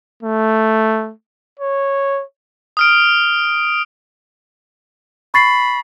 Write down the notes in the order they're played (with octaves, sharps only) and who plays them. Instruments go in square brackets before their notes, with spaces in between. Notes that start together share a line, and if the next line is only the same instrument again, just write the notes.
[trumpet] A3
C#5
[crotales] D#6 F6 D7
[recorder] B5 [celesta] C#6 A6 C7